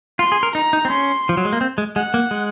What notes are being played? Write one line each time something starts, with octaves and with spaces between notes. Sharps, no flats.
F4 C6
G#4
A#4
D#4 A#5
D#4
C4
C#4 C6
F3
F#3
G#3
A#3
C4
G#3
G#3 F#5
A#3
G#3